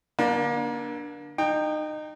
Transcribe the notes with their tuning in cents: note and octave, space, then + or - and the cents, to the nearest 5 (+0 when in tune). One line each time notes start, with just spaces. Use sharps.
D3 +0 A#3 +35 D4 +15
D#4 -25 G5 +10